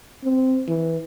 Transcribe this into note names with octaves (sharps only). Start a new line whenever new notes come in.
C4
E3